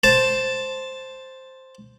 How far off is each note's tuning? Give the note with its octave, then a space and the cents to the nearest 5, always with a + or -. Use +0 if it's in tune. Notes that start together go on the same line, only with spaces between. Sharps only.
C5 +0 A5 +0